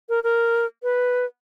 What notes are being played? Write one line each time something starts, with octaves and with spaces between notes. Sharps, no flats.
A#4
A#4
B4